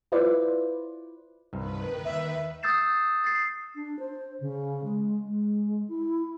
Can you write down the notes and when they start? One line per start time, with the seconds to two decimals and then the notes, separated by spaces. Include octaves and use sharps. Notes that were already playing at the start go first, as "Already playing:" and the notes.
0.12 E4 F4 B4 C5 D5
1.53 C2 G2 D#3 B4
2.05 D#2 E5
2.63 D#6 E6 G6 A6 C7 E7
3.24 A6 C7
3.75 D4
3.99 C5
4.40 C#3
4.84 G#3
5.25 G#3
5.88 E4